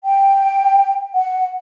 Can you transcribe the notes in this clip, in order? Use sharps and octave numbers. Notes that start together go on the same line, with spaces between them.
G5
F#5